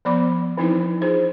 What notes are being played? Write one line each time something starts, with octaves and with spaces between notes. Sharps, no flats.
F3 B3 D5 B5 D6
E3 F3 C4 D#4 E4 B4
D#4 F4 G#4 C5